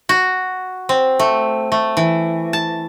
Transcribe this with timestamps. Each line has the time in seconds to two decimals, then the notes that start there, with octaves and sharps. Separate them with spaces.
0.09 F#4
0.89 C4
1.20 A3
1.72 A3
1.97 E3
2.53 A5